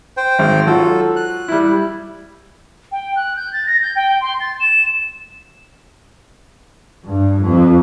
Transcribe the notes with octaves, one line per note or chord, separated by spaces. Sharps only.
C5 G5
G#1
F#3 F4 F#4 A4
F#6
G3 E4
G5
F#6
G6
A6
A#6
G6
G5
C6
A6
E7
G2
F2